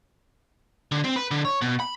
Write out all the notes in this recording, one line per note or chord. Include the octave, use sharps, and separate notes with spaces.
D3
C4
B4
D3
C#5
B2
B5